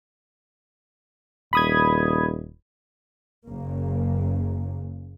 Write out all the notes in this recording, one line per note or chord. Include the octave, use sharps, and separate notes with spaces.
D#1 B5 D#6 G#6
F#1 C#3 A#3